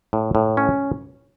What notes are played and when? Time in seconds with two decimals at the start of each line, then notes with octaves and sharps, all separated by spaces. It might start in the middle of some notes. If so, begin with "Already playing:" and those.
0.13 A2
0.35 A2
0.57 C#4